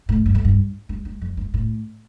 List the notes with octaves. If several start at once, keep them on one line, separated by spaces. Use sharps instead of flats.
A2
G2
F2
G2
G2
G2
F2
G2
A2